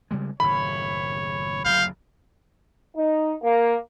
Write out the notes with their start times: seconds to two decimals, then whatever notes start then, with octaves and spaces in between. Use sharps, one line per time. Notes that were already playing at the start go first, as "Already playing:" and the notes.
0.11 C#3 G3 G#3
0.40 F#1 A2 D#3 C#5 B5
1.65 F#1 D2 F#3 F5 G6
2.97 D#4
3.43 A#3